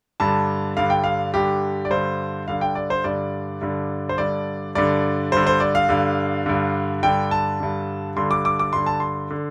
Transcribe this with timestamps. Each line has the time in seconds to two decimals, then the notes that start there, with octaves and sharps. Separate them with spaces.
0.20 G2 D3 A5
0.77 G2 D3 F5
0.90 G5
1.04 F5
1.34 G2 D3 G4
1.85 D5
1.90 G2 D3 C5
2.47 G2 D3 F5
2.61 G5
2.75 D5
2.90 C5
3.04 G2 D3 D5
3.61 G2 D3
4.09 C5
4.18 G2 D3 D5
4.75 G2 D3 D5
5.32 G2 D3 C5
5.47 C5
5.60 D5
5.75 F5
5.89 G2 D3
6.46 G2 D3
7.03 G2 D3 G5
7.31 A5
7.60 G2 D3
8.16 G2 D3 C6
8.31 D6
8.45 D6
8.59 D6
8.73 G2 D3 C6
8.86 A5
9.00 C6
9.30 D3